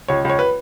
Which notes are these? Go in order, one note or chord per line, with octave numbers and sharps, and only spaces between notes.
C#2 C#5
C#2 C#5
B4